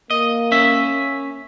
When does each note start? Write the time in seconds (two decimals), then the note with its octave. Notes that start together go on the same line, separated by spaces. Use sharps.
0.10 A#3 D#5
0.52 C#4 E5